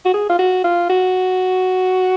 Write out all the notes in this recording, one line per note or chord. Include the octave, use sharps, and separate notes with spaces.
F#4
G#4
F4
F#4
F4
F#4